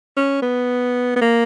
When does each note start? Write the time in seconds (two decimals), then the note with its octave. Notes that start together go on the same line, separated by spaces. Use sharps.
0.16 C#4
0.42 B3
1.16 B3
1.21 A#3